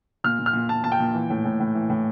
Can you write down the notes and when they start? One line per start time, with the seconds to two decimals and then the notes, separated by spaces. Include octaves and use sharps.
0.24 A#2 F6
0.39 A#2
0.46 F6
0.53 A#2
0.69 A#2 A5
0.84 A#2 A5
0.92 G5
1.00 A#2
1.14 E3
1.30 A2
1.45 A2
1.60 A2
1.75 E3
1.90 A2